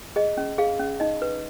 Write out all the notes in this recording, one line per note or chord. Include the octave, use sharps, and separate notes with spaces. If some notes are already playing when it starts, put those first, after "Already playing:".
G#4 D#5
C#4
G#4 F5
C#4
D#4 D#5
B4